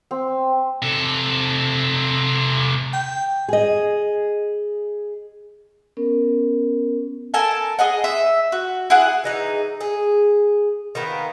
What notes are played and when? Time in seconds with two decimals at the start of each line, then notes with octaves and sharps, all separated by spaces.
0.11 C4
0.82 C3 A4
2.94 G5
3.48 G#4 D#5
5.97 B3 C#4 A#4
7.34 A4 A#4 G#5 A5
7.79 G#4 D#5 F#5
8.04 E5
8.52 F#4
8.90 E4 G#4 F#5
9.24 E3 D#4 G#4
9.81 G#4
10.95 D#3 A#3 B3